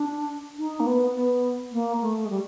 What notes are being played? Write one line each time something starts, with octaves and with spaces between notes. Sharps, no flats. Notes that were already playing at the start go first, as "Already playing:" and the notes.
Already playing: D4
D#4
A#3
B3
B3
A#3
A3
G#3
G3